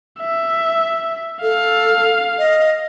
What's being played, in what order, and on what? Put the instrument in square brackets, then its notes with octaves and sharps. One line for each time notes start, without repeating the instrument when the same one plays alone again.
[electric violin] E5
[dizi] A4 [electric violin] F5
[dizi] D#5